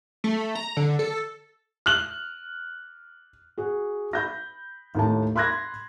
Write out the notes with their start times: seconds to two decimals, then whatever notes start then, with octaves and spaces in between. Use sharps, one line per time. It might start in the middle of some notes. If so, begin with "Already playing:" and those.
0.24 A3
0.55 A#5
0.77 D3
0.99 A4
1.86 F6 F#6 F#7
3.58 F#4 G#4
4.13 B5 G6 A#6
4.95 D#2 A2 A5
5.36 B5 C6 F#6 G#6 A#6